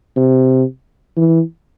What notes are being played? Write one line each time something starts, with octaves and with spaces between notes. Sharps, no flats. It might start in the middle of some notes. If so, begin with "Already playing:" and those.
C3
E3